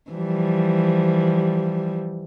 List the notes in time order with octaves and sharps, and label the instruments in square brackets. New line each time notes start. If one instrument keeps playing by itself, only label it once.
[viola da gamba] E3 F3 G3